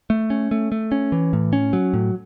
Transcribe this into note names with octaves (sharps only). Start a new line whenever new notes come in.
A3
C#4
A3
A3
C#4
E3
A2
C#4
F#3
A2